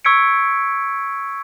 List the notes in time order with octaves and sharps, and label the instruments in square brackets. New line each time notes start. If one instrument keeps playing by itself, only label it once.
[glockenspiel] C#6 E6 G#6 B6 C#7 D7